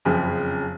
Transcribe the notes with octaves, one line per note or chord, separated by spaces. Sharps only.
F#1 F2 C#3